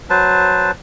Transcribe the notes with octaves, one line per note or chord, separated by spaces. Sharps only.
F#3 B4 C5 A5